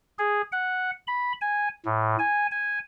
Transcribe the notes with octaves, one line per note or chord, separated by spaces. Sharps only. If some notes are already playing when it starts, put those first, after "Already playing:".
G#4
F#5
B5
G#5
A2
G#5
G#5